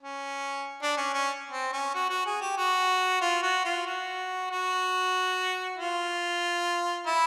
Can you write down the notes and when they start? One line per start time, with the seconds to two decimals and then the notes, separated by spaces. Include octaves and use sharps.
0.01 C#4
0.82 D4
0.97 C#4
1.14 C#4
1.51 C4
1.72 C#4
1.94 F#4
2.10 F#4
2.26 G#4
2.41 G4
2.57 F#4
3.21 F4
3.43 F#4
3.65 F4
3.86 F#4
4.51 F#4
5.78 F4
7.06 E4